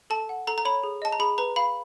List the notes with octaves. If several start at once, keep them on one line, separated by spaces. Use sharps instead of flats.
A4 A5
F#5
A4 A#5
A#5
C#5 B5
G#4
D#5 A5
A#5
G#4 B5
B4 A#5
F5 B5